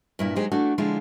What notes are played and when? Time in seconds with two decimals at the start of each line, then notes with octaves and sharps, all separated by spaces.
0.19 G2 A#2 E4
0.36 F#3 G#3 D#4 G4 G#4 C5
0.52 E3 A3 D4 F#4
0.78 D3 F3 G#3 D4 E4 F4